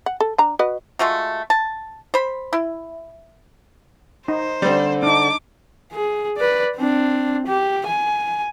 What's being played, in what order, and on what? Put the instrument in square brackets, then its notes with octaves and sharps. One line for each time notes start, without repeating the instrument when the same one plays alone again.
[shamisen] F#5
A4
D4 A#5
F#4 B4 D#5
[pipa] G#3 A3 F4 F#4
A5
C5 B5
E4
[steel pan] D#4 [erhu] C5
[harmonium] D3 [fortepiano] G3 C4
[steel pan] D4 D#4 [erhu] D6
[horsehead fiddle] G#4
B4 D5
C4 D4
G4
G#5